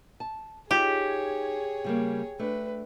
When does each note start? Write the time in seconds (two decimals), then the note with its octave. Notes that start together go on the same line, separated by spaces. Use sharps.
0.20 A5
0.71 D#4 F4 G4 G#4 C#5
1.84 C#3 G3 A#3
2.40 A3 D4 B4